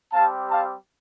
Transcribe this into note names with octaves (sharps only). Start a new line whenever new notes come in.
G3 C4 G4 F5 A5
F5 A5